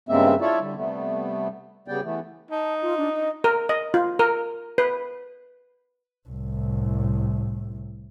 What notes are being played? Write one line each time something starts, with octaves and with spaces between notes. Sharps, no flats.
G2 C#3 G#3 A#3 C4 E5
E4 F4 A4 C#5 D5 E5
D3 G3
C3 G3 A3 B3
C#3 G3 B3 D5 G5
E3 A3 B3
D#4 A5
F4
D4
D#5
A#4
D#5
F4
A#4
B4
C2 A2